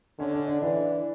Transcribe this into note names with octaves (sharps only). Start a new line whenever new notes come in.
D3 C#4
D4
D4
E3 D4